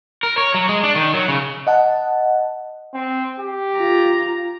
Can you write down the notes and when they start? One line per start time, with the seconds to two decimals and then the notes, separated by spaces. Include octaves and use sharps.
0.23 A#4
0.38 C#5
0.54 F#3
0.69 G#3
0.83 D4
0.96 D#3
1.14 F#3
1.28 C#3
1.67 D#5 F#5 A5
2.94 C4
3.40 G4
3.77 F4 A#5